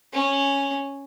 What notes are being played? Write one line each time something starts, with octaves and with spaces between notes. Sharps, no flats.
C#4